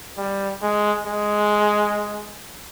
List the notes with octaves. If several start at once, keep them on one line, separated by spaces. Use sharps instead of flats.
G3
G#3
G#3